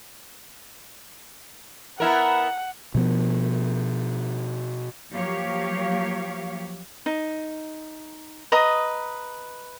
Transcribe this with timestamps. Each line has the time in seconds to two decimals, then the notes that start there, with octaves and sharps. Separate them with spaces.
2.00 B3 E4 A#4 F#5
2.95 B2 F3 B3
5.12 F3 F#3 A#3 G4 C#5 F5
7.06 D#4
8.52 B4 D#5 A#5 D#6